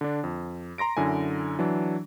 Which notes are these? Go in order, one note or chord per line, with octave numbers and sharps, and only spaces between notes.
D3 D4
F2
A#5 C6 A#6 D7
F#2 D3 E4 G#5
E3 F#3 D4